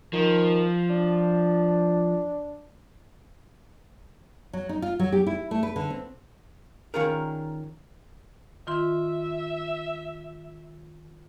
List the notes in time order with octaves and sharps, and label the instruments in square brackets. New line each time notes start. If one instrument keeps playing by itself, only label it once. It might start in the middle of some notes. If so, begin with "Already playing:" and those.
[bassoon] D#3 [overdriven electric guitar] F3
[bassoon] D4
[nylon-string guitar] F#3
D#4
F4
F#3
G4
E4
A3
B4
D3
C4
[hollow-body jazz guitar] D#3 C#4 F4 G#4 A#4
[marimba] D#3 F4 C6 [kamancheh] E5